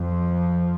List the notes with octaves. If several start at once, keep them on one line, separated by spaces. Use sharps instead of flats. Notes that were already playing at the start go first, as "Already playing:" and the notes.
Already playing: F2 F3